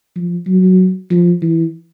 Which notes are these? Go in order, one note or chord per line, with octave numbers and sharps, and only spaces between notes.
F3
F#3
F3
E3